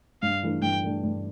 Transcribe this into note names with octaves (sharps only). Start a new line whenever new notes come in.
G2 F5
E3 A3 D4
G2 G5
E3 A3 D4
G2